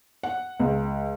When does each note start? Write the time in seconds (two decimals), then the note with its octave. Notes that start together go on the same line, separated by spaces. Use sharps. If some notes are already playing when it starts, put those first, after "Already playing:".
0.23 F#5
0.60 C#2